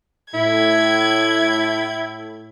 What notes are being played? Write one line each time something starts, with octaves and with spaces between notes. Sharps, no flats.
A2 E4 G#6